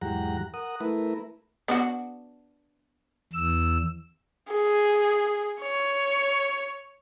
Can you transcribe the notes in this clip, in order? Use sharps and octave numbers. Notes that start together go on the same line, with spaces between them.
E2 G#2 F#3 G4 F#5 A#5
A#4 F#5 D#6
A3 E4 A#4 B4
B3 D4 F#4
E2 E6
G#4
C#5